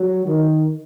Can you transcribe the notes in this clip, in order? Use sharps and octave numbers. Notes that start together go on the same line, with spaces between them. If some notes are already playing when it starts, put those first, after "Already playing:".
Already playing: F#3
D#3